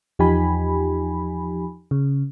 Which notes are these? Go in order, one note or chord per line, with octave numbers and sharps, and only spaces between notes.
E2 F3 D#4 G4 G#5 B5
C#3